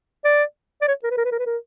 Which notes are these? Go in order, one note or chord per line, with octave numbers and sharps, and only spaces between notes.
D5
D5
C#5
A#4
B4
A#4
B4
A#4
B4
A#4